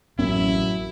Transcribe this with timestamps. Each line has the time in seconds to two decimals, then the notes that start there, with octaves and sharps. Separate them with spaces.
0.19 A1 F#2 C4 C#4 E4